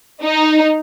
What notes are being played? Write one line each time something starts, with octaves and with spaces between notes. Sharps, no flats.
D#4